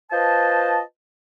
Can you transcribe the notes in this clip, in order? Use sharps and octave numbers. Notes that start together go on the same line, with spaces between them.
F4 B4 C5 D#5 A5